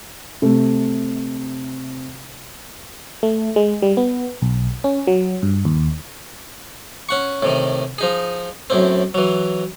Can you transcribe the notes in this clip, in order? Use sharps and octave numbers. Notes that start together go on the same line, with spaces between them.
C3 A3
A3
G#3
G3
B3
B1
C#4
F#3
G2
D#2
C#4 F#5 C#6
A2 C3 D#3
F3 D#4 G#4
F#2 A2 C4
E3 F#3